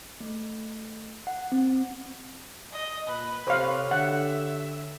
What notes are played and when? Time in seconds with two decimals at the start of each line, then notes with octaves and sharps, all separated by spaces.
0.20 A3
1.27 F#5
1.52 C4
2.72 D#5
3.08 A#2 B4
3.47 C3 G4 A4 C5 C#5 F5
3.91 D3 E5 F#5